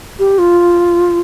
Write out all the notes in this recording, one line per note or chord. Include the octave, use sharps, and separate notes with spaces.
G4
F4